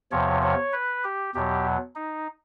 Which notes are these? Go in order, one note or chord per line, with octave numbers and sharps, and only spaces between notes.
E2 C3 F3 C#5
C#5
B4
G4
E2 B2 F#3 G4
D#4